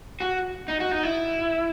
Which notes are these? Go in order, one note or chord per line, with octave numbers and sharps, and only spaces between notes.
F#4
D#4
F#4
D#4
E4